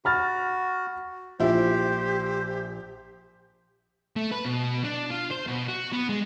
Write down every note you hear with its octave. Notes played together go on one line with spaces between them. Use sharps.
F#4 B5 F6 A6
A#1 F3 E4 G4 C5
A3
B4
B2
D4
F4
C5
B2
F#4
B3
G#3